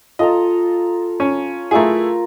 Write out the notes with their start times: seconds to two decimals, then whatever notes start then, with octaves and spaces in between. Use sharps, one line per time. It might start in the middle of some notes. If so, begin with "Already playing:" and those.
0.19 F4 A4 D#5 A#5
1.20 C#4
1.71 A3 E4 F4 G#4 A#4